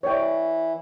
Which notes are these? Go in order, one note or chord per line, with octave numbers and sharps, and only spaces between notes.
E3 C#5 D5 G5